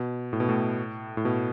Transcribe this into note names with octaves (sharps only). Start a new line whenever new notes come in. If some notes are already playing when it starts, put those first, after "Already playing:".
Already playing: B2
A2
B2
A2
A2
B2